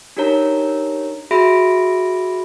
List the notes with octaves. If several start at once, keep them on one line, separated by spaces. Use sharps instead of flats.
D4 D#4 G4 A#4 C#5 A#5
F#4 G#4 E5 B5 A#6 D7